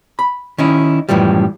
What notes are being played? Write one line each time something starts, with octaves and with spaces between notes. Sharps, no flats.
B5
D#3 C#4 D#4 E4
F#2 A2 E3 F3 G3